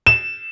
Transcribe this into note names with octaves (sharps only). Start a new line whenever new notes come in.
E7